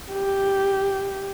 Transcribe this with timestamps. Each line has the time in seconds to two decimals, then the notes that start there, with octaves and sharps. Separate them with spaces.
0.12 G4